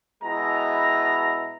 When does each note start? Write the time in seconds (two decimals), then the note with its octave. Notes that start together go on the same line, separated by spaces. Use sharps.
0.24 B2 G#3 E4 A#5